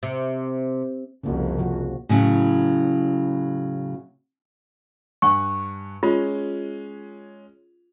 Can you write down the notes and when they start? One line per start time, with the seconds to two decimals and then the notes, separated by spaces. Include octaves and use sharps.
0.03 C3
1.24 C2 F2 C#3 A#3 F#4
1.58 C3 F3 F#4
2.09 A2 C#3 F#3
5.22 G2 F#5 G#5 C#6
6.03 G#3 C#4 F4